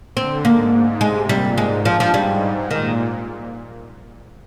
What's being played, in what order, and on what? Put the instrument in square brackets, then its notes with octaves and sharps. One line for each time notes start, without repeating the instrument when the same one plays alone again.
[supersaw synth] D3 [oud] C4
[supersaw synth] G#2 [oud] A#3
[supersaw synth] G#2
[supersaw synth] C3 [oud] G#3
[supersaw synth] A#2 [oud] G3
[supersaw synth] G#2 [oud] G#3
[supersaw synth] G2 [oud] F3
[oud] F3
[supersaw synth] G#2 [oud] G3
[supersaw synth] A#2 [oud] D#3